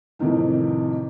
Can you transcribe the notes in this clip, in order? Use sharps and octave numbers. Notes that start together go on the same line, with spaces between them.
F2 A2 C3 D#3 E3